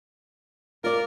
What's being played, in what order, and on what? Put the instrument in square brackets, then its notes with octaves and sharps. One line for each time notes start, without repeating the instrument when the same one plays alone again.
[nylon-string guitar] F4 D5 [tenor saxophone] A#4